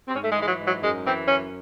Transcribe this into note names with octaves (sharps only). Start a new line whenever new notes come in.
C4
G#2 C#4
A3
G#3
E3
G#3
F#3
G#2
F#3
F#2 G#3
E3 C4
F#2 C#4